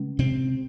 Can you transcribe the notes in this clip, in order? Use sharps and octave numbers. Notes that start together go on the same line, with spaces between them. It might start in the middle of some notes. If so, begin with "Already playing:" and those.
Already playing: C#3 G#3 C#4
C3 C4